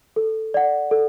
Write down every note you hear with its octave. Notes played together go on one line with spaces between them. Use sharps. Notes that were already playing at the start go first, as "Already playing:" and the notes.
A4
D5 F#5
A4